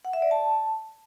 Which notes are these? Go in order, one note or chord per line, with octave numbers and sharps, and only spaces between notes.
F#5
E5
D5
A5